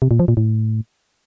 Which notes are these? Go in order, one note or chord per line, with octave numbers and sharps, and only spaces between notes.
C3
A#2
F3
A#2
A2